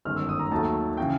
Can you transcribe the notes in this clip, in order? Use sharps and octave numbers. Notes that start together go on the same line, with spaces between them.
G1 F#2 D#3 G#3 F6
E6
D#6
A#5
D#2 D#3 F#3 A3 A5
C#3 E3 G5